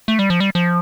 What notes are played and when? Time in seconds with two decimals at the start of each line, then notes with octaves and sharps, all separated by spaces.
0.08 A3
0.19 G3
0.30 F3
0.40 G3
0.55 F3